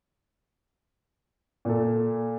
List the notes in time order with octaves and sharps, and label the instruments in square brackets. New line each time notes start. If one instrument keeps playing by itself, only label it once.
[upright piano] A#2 A4